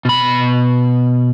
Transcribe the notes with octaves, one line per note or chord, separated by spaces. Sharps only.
B2 B5